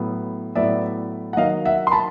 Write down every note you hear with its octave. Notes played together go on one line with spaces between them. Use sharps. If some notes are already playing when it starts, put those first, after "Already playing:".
Already playing: A2 F#3 B3
A2 F#3 B3 D5 E5
F#5
D#3 F#3 A#3 D#5 F5
E5 F#5
C6
A5 B5